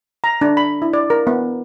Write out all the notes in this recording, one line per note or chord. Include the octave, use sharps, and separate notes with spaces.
A#5
D4
B5
E4
D5
A#4
B3